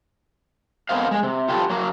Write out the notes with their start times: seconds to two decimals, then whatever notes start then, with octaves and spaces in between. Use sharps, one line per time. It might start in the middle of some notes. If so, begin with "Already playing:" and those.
0.89 B3 C4 A#4 C5 D#5 F5
1.11 G#3 G#4
1.23 C3
1.48 F4 G4 A4 B4
1.69 F#3 A#3